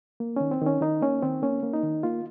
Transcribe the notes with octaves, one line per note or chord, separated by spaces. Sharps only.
A#3
D#3 C#4
C4
D#3 C#4
D#3 D#4
A#3 C#4
D#3 C4
A#3 C#4
A#3
D#4
D#3
A#3 F4